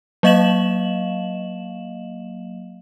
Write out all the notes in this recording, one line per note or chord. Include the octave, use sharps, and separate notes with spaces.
F#3 A#3 D#5 F5 E7 F#7